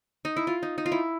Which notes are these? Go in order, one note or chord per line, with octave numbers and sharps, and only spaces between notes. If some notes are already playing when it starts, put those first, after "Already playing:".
D#4
E4
F4
D#4
D#4
F4
E4